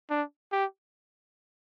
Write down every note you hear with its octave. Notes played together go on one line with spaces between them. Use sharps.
D4
G4